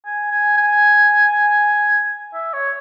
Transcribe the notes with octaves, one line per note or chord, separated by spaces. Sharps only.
G#5
G#5
G#5
E5
C#5